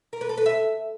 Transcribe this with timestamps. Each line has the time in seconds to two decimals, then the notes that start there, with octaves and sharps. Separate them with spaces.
0.13 A#4
0.21 B4
0.29 A4
0.38 B4
0.46 E5